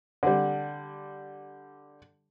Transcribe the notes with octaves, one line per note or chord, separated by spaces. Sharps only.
D3 G3